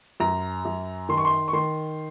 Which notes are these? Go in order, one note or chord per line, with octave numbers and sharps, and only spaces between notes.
F#2 A#5
F#2
D#3 C6
C#6
C6
C#6
D#3 C6